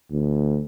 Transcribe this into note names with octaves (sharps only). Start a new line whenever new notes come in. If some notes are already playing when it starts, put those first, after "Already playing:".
D2